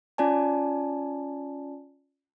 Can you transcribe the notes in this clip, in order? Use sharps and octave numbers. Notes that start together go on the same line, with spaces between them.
C#4 F4 D5 G#5 A5